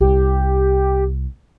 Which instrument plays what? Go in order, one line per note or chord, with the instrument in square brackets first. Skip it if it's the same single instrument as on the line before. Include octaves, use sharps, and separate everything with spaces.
[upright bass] C2 [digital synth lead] G4